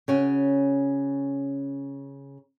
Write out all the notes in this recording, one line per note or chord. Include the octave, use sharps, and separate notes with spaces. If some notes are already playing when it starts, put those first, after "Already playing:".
C#3 C#4 F#4